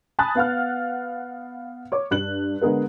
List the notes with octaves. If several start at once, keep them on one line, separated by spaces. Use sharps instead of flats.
G#5 A5 B5 D#6 F#6 A6
B3 F5 F#5 F6
C#5 D6
G2 F#6 F#7
D3 G#3 B3 G#4 A#4